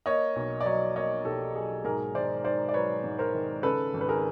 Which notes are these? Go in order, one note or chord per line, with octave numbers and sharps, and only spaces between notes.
A#3 C#5 D#5
B1
D5
F#3 C#5 D#5
A#3 C#5 D#5
B1 G4 A4
F#3 G#4
G#2 G#4 A#4
D#3 C5 D5
D#3 C5 D5
D5
F#3 B4 C#5
G#2
A#4 C5
D#3
C#3 A4 B4
G#1
B4
G#4 A#4